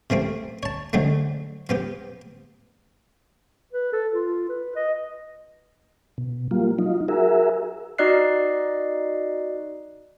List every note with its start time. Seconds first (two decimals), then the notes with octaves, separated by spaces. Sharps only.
0.10 C3 F3 A3 C4
0.63 C#5 A5
0.93 D3 F3 F#3 G#3 A3
1.69 F3 B3 G4
3.73 B4
3.92 A4
4.13 F4
4.49 B4
4.76 D#5
6.18 B2
6.51 F#3 G3 A#3 F4
6.79 F#3 D#4 F4
7.08 F#4 G#4 A#4 E5
7.98 D#4 F#4 D5 D#5 F#6 C7